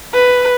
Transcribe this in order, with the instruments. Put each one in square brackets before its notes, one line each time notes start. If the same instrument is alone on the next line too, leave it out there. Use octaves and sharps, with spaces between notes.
[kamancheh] B4